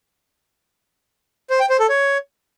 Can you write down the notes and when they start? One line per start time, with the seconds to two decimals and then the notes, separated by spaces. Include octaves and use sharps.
1.50 C5
1.60 G5
1.70 C5
1.79 A4
1.89 C#5